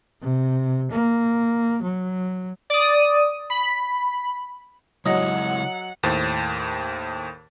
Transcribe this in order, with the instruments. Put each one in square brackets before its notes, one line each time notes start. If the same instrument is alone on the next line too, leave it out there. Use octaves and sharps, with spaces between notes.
[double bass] C3
A#3
F#3
[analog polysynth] D5 D#6
B5
[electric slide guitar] C#3 G#3 E4 [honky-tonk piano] F#3 [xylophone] D#5 D#6 [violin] F#5
[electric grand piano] D#2 A2 C5 A6